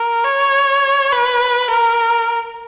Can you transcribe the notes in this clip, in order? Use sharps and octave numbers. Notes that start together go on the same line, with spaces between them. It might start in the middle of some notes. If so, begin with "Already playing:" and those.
Already playing: A#4
C#5
B4
A#4